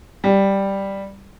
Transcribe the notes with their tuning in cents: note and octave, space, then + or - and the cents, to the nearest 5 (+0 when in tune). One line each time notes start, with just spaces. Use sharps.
G3 +0